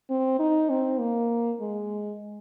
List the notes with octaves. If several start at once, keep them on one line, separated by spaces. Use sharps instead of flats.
C4
D#4
C4
A#3
G#3